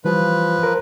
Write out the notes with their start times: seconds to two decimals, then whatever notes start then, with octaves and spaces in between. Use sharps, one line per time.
0.05 E3 F3 G3 F4 B4
0.63 A#4 C5